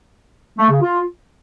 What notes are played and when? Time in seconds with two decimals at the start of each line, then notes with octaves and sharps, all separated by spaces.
0.58 A3
0.70 C#3
0.81 F4